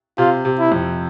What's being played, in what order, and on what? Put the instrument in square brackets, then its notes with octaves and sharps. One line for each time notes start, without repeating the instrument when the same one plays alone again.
[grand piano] C3 [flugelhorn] F4
[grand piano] C3
[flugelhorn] E4
[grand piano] F2